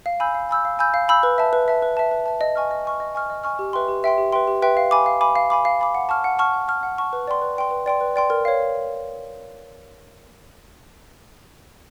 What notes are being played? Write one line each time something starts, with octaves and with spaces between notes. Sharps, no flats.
F5
G#5 B5 E6 G6
F5
G#5 B5 E6 G6
F5
G#5 B5 E6 G6
F5
G#5 B5 E6 G6
B4
E5 A5
B4
E5 A5
B4
E5 A5
B4
E5 A5
D#5
G#5 C#6 F6
D#5
G#5 C#6 F6
D#5
G#5 C#6 F6
D#5
G#5 C#6 F6
G4
B4 E5 G5 C6
G4
B4 E5 G5 C6
G4
B4 E5 G5 C6
G4
B4 E5 G5 C6
F5
G#5 B5 D6
F5
G#5 B5 D6
F5
G#5 B5 D6
F5
G#5 B5 D6
F#5
A5 C#6 F6
F#5
A5 C#6 F6
F#5
A5 C#6 F6
F#5
A5 C#6 F6
B4
D5 G5 C6
B4
D5 G5 C6
B4
D5 G5 C6
B4
D5 G5 C6
A#4
C#5 F5